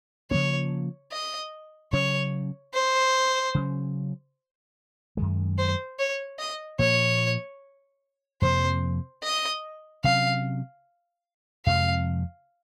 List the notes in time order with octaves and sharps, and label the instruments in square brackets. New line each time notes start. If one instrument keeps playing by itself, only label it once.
[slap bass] C#3 F3 A#3 C#4 [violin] C#5
[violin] D#5
[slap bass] C#3 F#3 C#4 [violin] C#5
[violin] C5
[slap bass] C#3 F#3 C#4
F#2 D#3 G#3
[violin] C5
C#5
D#5
[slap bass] A#2 F3 A#3 [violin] C#5
[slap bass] F2 C3 F3 A#3 [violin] C5
[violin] D#5
[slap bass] C3 F#3 C#4 [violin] F5
[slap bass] F2 C3 F3 G#3 [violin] F5